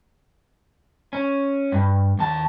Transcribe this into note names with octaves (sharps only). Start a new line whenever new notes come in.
C#4
G2
D#2 A5